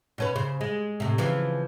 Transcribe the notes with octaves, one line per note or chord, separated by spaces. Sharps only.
B2 C#4 B4
C#3 C5
G#3
A2 C3
C#3 E3 F3